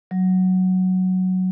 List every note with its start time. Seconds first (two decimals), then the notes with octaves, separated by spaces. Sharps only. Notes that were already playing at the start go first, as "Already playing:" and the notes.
0.11 F#3